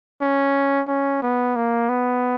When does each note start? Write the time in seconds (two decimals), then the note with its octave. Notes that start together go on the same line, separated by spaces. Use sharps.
0.21 C#4
0.88 C#4
1.22 B3
1.56 A#3
1.89 B3